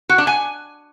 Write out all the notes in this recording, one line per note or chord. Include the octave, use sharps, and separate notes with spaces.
F#4
D4
G#5